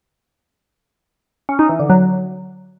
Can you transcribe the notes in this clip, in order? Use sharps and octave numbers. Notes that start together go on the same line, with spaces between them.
C#4
D#4
E3
D3
F#3